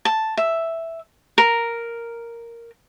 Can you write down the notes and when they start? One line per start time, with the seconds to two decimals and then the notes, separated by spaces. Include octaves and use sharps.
0.05 A5
0.37 E5
1.38 A#4